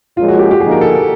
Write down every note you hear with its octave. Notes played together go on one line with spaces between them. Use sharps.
A#2 F3 G#3 C#4 F4
F#4
G4
G4
D3 F3 A#3 D#4 G#4
A#4
A4